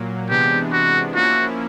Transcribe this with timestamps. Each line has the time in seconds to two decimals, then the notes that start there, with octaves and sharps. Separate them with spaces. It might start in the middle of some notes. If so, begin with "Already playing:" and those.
Already playing: A#2 F#3 A#3
0.30 C3 E3 G#3 B3 D4 G4
0.73 F#4
1.14 F3 A#3 C#4 E4 F#4